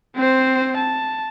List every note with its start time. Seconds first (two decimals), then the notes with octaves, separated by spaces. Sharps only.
0.16 C4 C5
0.77 A5